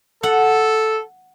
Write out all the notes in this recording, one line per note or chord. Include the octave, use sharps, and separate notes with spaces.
A4 F#5